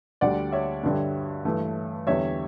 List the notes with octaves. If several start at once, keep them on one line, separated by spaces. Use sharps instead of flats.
D2 D3 G3 D5 F#5
C#5 E5
G2 D3 G3
G2 E3 A3
E2 D3 G3 C#5 E5